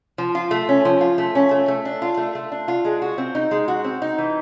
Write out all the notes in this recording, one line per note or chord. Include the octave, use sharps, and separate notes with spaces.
F3
F4
A3
C#4
F3
F4
A3
C#4
A3
A3
D4
F4
A3
A3
D4
F4
G#3
F#4
C4
D#4
G#3
F#4
C4
D#4
E3